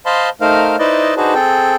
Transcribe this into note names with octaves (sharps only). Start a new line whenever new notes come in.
C5 D#5 F5 A5 B5 C6
A3 D#4 A#4 C5 F5
D#4 E4 B4 C5 D5 D#5
D4 D#4 F#4 G#4 B4 C5
C4 G#4 A4 G5